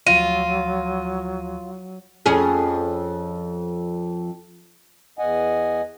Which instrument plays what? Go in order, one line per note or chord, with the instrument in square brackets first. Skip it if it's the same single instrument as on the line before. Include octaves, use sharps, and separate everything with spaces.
[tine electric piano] D2 F3 A#6 [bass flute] F#3 [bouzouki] F4 [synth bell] D#7
[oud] F2 C#4 G#4
[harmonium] E2 D#5 F#5 G#5